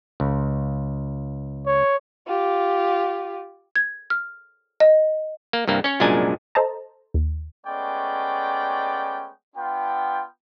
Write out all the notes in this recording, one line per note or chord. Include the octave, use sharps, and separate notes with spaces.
C#2
C#5
F4 G4
G#6
F6
D#5
A#3
C2 G2 A#3
C#4 C#5
C2 F#2 A#2 G#3 D4 G#5
A4 C5 D#5 A5 A#5
D#2
G#3 A3 B3 C#4 D5 G5
B3 D4 F4 G5